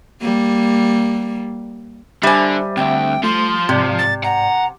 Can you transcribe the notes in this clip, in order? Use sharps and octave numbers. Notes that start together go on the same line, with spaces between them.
G3 A#3
D3 G3 C5 E5 G#5
D2 C4 E5 G5
F3 A3 C6
G#2 C3 D5
A6
F#5 A#5